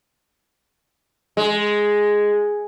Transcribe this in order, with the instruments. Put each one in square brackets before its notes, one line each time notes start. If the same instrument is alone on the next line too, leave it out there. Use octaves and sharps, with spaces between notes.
[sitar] G#3